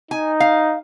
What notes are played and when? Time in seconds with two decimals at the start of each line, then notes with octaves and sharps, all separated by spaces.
0.11 D#4 G#5
0.40 F5